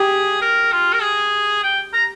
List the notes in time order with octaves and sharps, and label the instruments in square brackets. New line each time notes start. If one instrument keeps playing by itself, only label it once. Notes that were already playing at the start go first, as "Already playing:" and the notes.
Already playing: [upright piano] G4 [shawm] G#4
[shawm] A#4
F4
A#4
G#4
G5
A#5